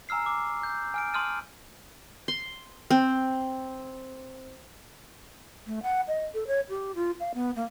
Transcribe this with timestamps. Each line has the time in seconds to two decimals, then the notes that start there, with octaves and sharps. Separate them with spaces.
0.09 G#5 A#5 E6 F6 C7
0.26 D6
0.63 G6
0.94 G#5 F6 D7
1.14 A5 C6 D#6 F6 A6 D#7
2.28 C6
2.90 C4
5.67 A3
5.83 F#5
6.08 D#5
6.34 A4
6.47 C#5
6.69 G4
6.95 F4
7.20 F5
7.34 B3
7.56 A#3